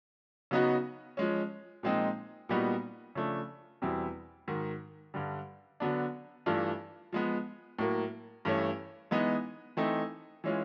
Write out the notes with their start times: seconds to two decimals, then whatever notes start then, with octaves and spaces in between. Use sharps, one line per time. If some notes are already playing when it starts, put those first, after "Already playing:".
0.51 C#3 F#3 B3 D#4 F#4
1.17 F3 G#3 C#4
1.83 A#2 F3 G#3 C4 D#4
2.49 A#2 G3 B3 D#4 F#4
3.15 C#3 F3 A3 D4
3.82 E2 B2 G3 C4 E4
4.48 G#2 D#3 F#3
5.14 G2 D3 G3
5.80 D3 F#3 B3 D4
6.46 G2 E3 A3 D4 F4
7.13 F3 G#3 B3
7.79 A2 F#3 A#3
8.45 G2 E3 A3 C#4
9.11 E3 G#3 B3 D#4
9.77 E3 A3 C4 D#4
10.44 E3 G#3 C#4 F4